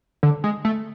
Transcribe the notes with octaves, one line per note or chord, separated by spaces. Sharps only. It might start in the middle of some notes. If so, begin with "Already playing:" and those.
D3
G#3
A3